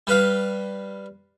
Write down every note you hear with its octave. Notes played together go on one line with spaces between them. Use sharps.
G3 B4 F5